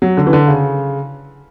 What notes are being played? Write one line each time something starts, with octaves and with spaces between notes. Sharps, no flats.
F#3
D3
E3
D3
C#3